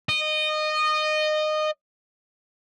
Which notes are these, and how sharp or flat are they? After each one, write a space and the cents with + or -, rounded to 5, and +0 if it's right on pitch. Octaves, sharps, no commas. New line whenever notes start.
D#5 -20